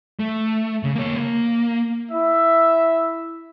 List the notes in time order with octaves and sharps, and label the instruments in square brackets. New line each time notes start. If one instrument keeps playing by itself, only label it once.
[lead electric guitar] A3
C#3
A#3 C#5
A#3
[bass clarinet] E4 [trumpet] E5